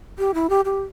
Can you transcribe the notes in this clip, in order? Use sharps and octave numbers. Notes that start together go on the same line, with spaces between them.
G4
E4
G4
G4